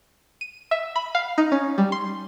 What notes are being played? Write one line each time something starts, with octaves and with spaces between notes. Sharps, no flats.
D#7
E5
B5
F5
D#4
C#4
G3
C6